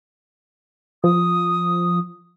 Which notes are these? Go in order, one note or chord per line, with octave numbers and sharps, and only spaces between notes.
F3 D#6